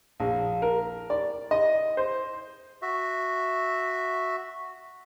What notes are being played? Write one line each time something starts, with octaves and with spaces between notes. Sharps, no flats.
A#1
A#4
D5
D#5
C5
F#4 E5